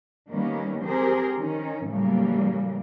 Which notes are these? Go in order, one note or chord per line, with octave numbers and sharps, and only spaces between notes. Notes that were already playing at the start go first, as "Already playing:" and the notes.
D#3 G3 A#3 B3 C#4
C4 G4 G#4 A#4 C5
D#3 C#4
A2 C#3 E3 F#3 G3 A#3